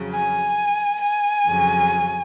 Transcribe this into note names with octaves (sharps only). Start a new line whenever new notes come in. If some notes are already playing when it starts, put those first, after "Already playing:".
Already playing: F2 C#3 F#3
G#5
G#5
F2 C#3 F#3